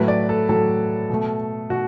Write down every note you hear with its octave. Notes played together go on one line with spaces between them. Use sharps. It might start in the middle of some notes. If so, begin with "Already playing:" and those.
Already playing: A2 F#3 A3 B4
D5
A4
A2 F#3 A3 A4
B2 A3
B2 F#4